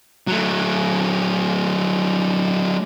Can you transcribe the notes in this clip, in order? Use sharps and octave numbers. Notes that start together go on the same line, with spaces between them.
F#3 A3